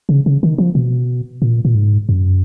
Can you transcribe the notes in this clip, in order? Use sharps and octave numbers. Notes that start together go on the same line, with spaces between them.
C#3
C#3
D#3
F3
B2
A#2
A#2
G#2
F#2